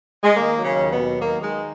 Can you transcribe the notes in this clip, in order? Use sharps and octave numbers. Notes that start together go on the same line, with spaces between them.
G#3
D#3 A#3
F#3
C#3 C#4
D#2
B2 B3
F#3
D#3 A#3
D#3 G#3